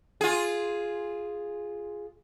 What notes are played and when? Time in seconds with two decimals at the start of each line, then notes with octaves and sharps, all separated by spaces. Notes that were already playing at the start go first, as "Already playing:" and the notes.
0.21 F4 G#4